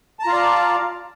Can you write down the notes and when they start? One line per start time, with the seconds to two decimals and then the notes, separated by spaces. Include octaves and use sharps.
0.19 A5
0.23 A#5
0.26 F4
0.29 F5
0.33 D5